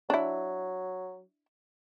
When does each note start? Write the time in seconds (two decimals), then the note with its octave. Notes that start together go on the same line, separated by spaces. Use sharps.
0.10 F#3 D4 E4